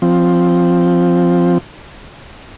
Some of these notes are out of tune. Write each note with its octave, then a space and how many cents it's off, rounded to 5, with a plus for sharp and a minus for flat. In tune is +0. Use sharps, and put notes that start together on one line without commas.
F3 +0 C4 +0